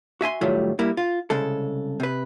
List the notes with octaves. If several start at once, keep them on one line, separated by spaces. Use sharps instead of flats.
F#4 E5 G#5 C6
A2 D#3 F#3 G3 A3 F4
G3 A#3 E4
F4
C2 C#3 G#3 A4
C3 B4